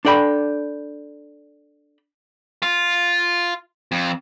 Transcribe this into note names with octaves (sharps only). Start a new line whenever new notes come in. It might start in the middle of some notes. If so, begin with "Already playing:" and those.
D4 A4 D5 G5 B5
F4
F2